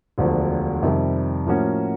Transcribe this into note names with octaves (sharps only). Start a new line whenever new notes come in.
E1 D2 D3 F3
F2 C3 D#3 G3
A2 F3 A#3 C#4 F#4